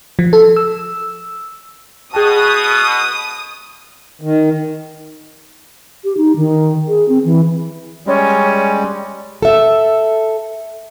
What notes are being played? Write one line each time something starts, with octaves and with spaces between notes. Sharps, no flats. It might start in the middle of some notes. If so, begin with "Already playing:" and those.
F3
A4
E6
B2 G#4 G5 A5 D#6
D#3
G4
D#4
D#3
G#4
C4
E3
G3 G#3 C#4
A4 E5